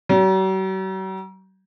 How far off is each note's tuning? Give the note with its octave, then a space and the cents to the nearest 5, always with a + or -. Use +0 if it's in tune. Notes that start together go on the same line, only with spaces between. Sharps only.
F#3 +45